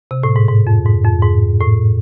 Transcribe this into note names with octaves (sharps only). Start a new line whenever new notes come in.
C3
A2
G#2
G#2
F2
G#2
F2
G#2
A2